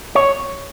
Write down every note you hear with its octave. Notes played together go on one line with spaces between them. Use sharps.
C#5